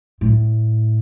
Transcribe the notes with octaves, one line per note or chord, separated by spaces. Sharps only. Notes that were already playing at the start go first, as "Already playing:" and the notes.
A2